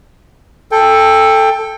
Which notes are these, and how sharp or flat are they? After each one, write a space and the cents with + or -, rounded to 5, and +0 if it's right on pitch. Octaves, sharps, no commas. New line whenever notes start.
A4 +0 G5 +20